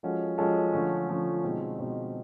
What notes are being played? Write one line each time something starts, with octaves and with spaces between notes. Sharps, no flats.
F3 G#3 C#4 F#4 A4
F3 G#3 C#4 F#4 A4
D3 F3 A3 C#4
D3 F3 A3 C#4
B2 G#3 C4 D#4
B2 G#3 C4 D#4